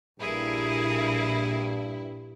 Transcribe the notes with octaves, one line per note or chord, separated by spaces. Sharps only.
A#1 G2 A#2 E4 G#4 A#4